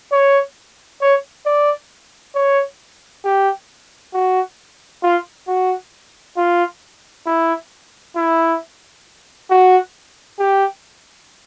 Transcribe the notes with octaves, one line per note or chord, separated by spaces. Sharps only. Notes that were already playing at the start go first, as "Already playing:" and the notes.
C#5
C#5
D5
C#5
G4
F#4
F4
F#4
F4
E4
E4
F#4
G4